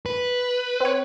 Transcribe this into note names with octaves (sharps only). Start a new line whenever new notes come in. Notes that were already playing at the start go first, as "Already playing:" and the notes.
B4
C4 C#5